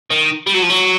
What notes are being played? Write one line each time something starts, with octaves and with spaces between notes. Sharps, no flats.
D#3
G3
F#3
F3
F#3